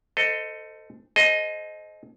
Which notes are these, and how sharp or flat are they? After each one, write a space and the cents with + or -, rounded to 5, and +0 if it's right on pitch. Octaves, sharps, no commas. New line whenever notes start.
A4 +15 C5 -20 D#5 +0
A4 -45 C5 +0 D#5 +0